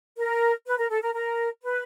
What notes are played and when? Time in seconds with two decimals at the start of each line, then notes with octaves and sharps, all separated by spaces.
0.18 A#4
0.67 B4
0.78 A#4
0.90 A4
1.02 A#4
1.14 A#4
1.63 B4